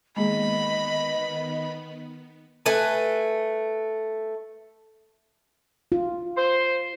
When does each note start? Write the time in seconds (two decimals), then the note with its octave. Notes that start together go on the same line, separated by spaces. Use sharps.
0.17 D#3 G#3 A#3 B3 G#4 D#5 B5
2.66 A3 B4 G#5
5.92 F4
6.36 C5